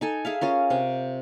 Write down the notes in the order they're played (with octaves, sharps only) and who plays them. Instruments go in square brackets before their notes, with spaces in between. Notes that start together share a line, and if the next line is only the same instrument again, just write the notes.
[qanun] D#4 A4 G#5
G#4 E5 F5
C#4 F4 A#4
C3 G5